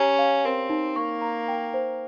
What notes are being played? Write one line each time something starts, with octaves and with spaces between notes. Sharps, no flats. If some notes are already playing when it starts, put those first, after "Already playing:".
Already playing: C#4 G4 A#5
F5
C4 A#4
D#4
A#3 C#6
A#5
G5
C5